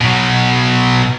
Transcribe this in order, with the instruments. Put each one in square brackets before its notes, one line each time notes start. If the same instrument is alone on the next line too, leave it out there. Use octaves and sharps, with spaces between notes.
[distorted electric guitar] B2 F#3